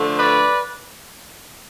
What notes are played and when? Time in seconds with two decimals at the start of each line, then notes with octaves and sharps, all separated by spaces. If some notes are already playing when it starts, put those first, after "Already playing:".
Already playing: D3 F3 A3
0.18 B4 D5